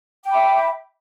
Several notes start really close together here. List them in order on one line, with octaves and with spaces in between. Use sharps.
G5 D6 B5 E5